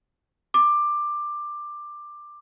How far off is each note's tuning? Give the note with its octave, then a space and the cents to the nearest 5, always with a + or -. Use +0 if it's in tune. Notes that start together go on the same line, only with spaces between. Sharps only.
D6 +15